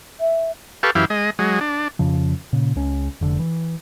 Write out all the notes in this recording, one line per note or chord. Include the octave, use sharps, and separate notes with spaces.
E5
G4 A4 B4 F5 C#6
F#2 E3 E4 G4 F5
G#3 D#5
F#3 G#3
D4
F2 C#3 F3
A#2 C#3
C#2 C#4
F1 D3
E3